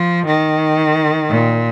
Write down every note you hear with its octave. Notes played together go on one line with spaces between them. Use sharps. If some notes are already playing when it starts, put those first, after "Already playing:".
Already playing: F3
D#3
A#2